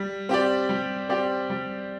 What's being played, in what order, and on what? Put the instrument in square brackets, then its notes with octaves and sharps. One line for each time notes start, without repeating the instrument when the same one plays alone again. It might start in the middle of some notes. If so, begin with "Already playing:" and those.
Already playing: [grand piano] G3
C4 G4 D5
G3
C4 G4 D5
G3